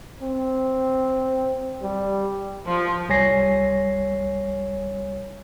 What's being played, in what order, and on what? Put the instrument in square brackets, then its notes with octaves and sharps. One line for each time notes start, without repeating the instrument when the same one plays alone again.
[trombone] C4
G3
[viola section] F3
[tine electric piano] C2 G3 C#5 G#5 A#6 C7